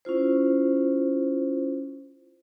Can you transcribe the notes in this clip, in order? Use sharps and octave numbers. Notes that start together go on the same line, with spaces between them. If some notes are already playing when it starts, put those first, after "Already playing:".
C#4 E4 F4 C5